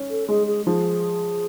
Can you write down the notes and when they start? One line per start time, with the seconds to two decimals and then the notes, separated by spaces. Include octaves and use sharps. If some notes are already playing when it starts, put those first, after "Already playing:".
Already playing: C#4
0.10 A4
0.28 G#3 G#4
0.47 G#4
0.66 F3 G#4